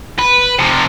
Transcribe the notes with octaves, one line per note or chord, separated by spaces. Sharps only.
B4
C3 F3